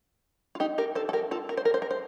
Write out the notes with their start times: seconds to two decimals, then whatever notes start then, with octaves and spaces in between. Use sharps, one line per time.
0.55 F4
0.60 D#4 G4
0.78 G4 A#4
0.95 A4 C5
1.09 A4
1.13 G4 A#4
1.31 F4 A4
1.49 A#4
1.57 C5
1.65 A#4
1.74 C5
1.82 A#4
1.91 C5